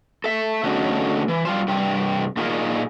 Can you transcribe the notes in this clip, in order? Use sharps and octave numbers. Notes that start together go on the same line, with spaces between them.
A4 E5
D3 A3 C#4 D#4 F#4 G#4
E3
G3 F4 C5
G2 C3 G3 C4 G4
A#2 D#4 F4 G#4 A#4